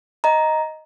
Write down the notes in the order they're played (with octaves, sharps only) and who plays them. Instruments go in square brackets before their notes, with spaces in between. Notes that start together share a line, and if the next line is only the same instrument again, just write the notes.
[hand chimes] D#5 A#5